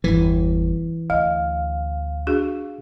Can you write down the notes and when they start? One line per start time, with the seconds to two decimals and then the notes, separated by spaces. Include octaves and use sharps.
0.04 G1 E2 E3
1.10 D2 D#5 F5
2.27 D4 F#4 G#4